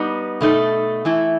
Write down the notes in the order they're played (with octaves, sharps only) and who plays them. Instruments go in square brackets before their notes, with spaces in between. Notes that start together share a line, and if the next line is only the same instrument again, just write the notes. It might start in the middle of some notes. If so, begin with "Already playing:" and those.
Already playing: [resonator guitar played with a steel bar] G3 B3 D#4
B2 A3 D#4 A4
E3 A3 E4